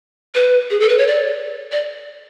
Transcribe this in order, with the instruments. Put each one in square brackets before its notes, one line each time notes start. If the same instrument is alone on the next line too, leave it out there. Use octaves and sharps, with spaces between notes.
[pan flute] B4
G#4
A4
B4
C#5
D5
D5